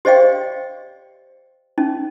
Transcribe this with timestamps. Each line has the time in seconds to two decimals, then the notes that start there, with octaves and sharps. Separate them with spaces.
0.05 G4 C5 D5 D#5 F5 G5
1.78 C#4 D#4